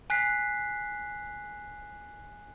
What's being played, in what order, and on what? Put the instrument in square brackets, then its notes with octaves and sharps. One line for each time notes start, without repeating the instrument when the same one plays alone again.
[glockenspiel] G#5 F#6 B6 C7